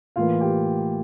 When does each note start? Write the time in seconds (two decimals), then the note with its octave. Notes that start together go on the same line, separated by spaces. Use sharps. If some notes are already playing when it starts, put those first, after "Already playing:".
0.16 A2 E3 A#3 F4 F5
0.40 G4 G5